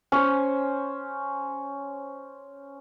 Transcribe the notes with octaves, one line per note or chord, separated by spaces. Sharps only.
C#4 C5